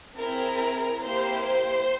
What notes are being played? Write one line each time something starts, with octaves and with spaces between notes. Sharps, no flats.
C4 E4 G#4 A#4
A#3 E4 G4 C5
C5